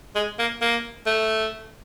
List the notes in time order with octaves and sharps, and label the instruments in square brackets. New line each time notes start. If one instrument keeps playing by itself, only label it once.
[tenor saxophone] G#3
A#3
A#3
A3